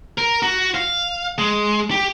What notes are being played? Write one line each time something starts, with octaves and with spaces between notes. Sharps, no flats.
A#4
F#4
F5
G#3
G4